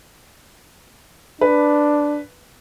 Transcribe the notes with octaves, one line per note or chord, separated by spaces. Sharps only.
D4 B4